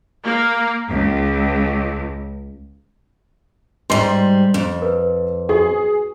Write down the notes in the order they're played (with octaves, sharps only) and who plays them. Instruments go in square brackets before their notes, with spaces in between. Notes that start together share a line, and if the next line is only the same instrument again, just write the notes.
[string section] A#3
C#2
[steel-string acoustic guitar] G#2 G3 [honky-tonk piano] C6 C7
[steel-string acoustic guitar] F2
[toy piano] A#4 B4
[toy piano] D#4 F#4 C#6 [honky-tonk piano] G#4